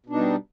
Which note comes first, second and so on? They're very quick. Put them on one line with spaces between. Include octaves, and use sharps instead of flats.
B2 D4 D#4 G3